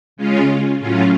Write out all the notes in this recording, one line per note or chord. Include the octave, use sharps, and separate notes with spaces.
C#3 G#3 C#4 F4
A2 F#3 C#4 F4